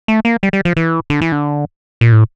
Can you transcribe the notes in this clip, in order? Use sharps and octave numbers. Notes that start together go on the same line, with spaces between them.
A3
A#3
G3
G3
F3
E3
D3
E3
D3
A#2
A2